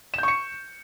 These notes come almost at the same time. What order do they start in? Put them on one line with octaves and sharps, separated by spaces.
E7 G6 C#6 C#7